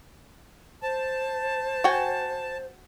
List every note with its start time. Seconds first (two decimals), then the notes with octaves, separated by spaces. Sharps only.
0.83 C5 A5
1.84 F#4 G5 G#5